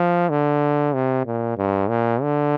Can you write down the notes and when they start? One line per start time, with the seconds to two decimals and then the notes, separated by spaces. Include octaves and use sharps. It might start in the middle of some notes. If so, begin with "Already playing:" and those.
Already playing: F3
0.30 D3
0.94 C3
1.26 A#2
1.57 G2
1.89 A#2
2.22 D3